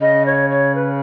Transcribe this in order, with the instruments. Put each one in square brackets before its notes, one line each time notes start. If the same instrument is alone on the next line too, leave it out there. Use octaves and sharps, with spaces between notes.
[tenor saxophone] C#3 [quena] D#5
[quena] C#5
C#5
B4